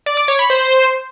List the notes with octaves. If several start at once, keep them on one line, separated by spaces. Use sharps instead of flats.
D5
D6
C#5
B5
C5